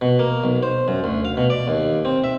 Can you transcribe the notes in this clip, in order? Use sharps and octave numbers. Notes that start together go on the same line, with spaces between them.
B2
A#3
B1
C5
F#2
D2
F5
B2
D5
D#2
C4
E5